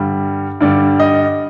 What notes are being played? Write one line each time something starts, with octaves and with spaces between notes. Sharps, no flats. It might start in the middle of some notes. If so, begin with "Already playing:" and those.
Already playing: G2 D3 G3
G2 D3 G3 D5
D#5